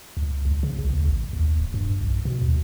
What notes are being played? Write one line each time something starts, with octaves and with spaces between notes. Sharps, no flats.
C#2
C#2
C#3
B1
D2
A1
D#2
D1
G2
B1
B2
D#2